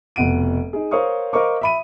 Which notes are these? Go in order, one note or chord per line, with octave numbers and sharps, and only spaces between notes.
F1 B2 F#5 D7 D#7
D#4 G#4
A#4 C5 C#5 F5 C#6 D#6
A#4 C5 D#5 F5 C#6 D6
E5 B5 D#7